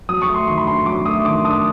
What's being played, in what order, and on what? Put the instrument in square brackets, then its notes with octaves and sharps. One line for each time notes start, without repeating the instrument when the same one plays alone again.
[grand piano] F#3 D#6
C#6
A3
C6
D#3 C6
B5
D4 C6
F#3 D6
A3 D#6
D#3 D6
D4 D#6